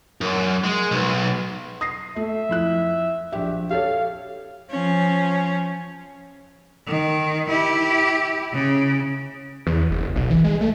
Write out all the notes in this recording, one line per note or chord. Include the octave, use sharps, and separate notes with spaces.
F#2
G#3
B1
D#6 A#6 C7
A3 E5
F2 E4 F#6
A#1 G4 E5
G4 A4 C#5 F5
F3 C#4
D#3
E4 G4
C#3
E2
F#1
B1
E3
G#3
A3